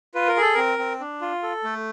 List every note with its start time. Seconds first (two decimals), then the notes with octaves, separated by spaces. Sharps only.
0.15 F4 B4
0.28 A#4
0.37 G#4 A4
0.54 C4 A#4
0.79 C4
1.00 D4
1.21 F4
1.43 A4
1.64 A3